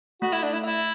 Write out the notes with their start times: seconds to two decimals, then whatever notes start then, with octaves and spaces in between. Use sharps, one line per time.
0.22 A3 F#4
0.33 E4
0.43 D4
0.53 E4
0.64 E4 E5